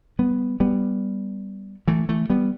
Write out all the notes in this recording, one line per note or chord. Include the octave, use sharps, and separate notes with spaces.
G3 B3
G3 B3
E3 A3
E3 A3
G3 B3